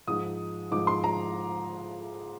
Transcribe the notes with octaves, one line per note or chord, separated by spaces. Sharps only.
G#2 F3 G#3 D#4 D#6
G#2 F3 G#3 D#4 D6
C6
A#5